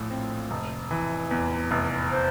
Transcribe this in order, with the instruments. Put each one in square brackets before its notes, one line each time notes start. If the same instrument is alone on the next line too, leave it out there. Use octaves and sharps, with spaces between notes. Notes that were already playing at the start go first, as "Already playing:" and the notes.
Already playing: [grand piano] A#1 A2 F3
C4
F1
E3
E2
F1
[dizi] C5